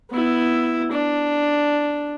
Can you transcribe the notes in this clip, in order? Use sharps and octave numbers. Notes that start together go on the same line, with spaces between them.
B3 E4
D4